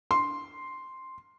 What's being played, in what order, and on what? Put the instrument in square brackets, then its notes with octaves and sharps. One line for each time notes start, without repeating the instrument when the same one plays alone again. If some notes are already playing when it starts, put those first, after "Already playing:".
[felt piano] C6